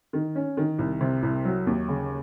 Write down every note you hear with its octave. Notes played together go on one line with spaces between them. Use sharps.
D#3
C#4
D#3
C2
C3
C2
F#3
D#2
C#3